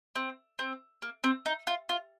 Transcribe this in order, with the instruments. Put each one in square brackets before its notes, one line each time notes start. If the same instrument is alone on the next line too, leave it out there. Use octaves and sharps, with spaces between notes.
[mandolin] C4
C4
A#3
C4
D#4
F4
F4